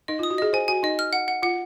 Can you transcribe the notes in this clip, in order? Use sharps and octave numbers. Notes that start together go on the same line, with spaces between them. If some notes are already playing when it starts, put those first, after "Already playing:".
D#4 D#5
F4 D#6
F#4
G#4 D#5
C5 G#5
F#4 G#5
D#4 D#5
F6
F#5
F#5
F4 F#5